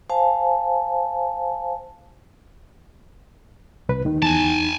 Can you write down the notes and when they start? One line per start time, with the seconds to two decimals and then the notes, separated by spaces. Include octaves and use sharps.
0.10 C5 F5 G#5 A5
3.89 C2 B4
4.05 D#2 D#3 D#4
4.22 E2 G#5 A5